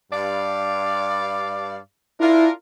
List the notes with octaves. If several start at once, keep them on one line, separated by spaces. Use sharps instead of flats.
G2 D5 F5
D4 E4 F4 A#4